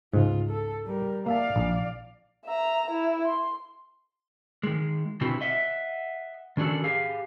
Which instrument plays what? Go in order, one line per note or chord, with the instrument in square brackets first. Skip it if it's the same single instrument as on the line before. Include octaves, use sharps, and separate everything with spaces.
[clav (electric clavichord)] C#2 G#2 [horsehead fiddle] F4
[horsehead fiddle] A4
G3 A#4
[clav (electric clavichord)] A#3 E5 A5 [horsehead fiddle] D5 F5
[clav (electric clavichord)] A#1
[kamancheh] E5 A#5
E4
C6
[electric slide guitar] D#3 G#3
B2 D3 C4 E4 F#4 G4
D#5 E5 F#5
D#3 C#4 D4 F#4 A4
G4 G#4 F5